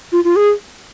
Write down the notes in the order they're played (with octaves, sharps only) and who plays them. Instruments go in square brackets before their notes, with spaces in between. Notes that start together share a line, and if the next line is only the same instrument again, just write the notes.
[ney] F4
F4
G#4